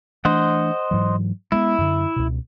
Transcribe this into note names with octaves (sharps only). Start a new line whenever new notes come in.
E3 A3 D4 C5 D#5 F#5
G#2 E3 F#3
G#3 A3 B3 E4
F#2 D3
C#2 B2